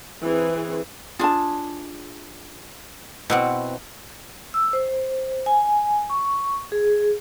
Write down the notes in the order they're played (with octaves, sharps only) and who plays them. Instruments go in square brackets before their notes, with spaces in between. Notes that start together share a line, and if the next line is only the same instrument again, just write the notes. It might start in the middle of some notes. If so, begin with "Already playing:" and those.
[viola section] E3 C4 G#4
[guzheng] D4 G#4 [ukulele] F4 A5
[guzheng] B2 B3 C4 [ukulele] E4 F#5
[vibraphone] E6
C5
G#5
C#6
G#4